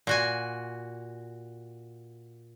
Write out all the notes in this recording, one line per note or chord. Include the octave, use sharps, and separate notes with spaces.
A#2 F#4 G#5